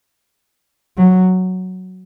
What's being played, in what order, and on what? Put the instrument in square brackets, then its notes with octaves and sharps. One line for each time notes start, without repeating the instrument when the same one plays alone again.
[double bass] F#3